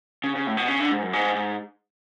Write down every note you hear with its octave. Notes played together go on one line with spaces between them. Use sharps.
C#3
C#3
A2
B2
C#3
D3
G#2
F#2
G#2
G#2